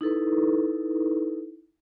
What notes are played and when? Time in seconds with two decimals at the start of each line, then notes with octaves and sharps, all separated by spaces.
0.01 D#4 E4 A4 B4